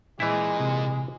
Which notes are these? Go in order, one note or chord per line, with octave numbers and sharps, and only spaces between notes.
A#2 E3 G#3 C4 E4
C3